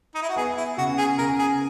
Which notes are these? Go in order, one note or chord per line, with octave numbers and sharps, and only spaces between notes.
D#4
E4
F#4
B3 G#4
E4
C#3 F#4
G#4
C#3 A#4
G#4